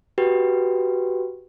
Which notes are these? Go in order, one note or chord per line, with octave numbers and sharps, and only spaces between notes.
F#4 G4 B4 G5